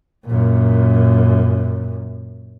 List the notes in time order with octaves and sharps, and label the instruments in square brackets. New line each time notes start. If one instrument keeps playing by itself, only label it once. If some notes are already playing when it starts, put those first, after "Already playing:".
[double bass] F#2 A#2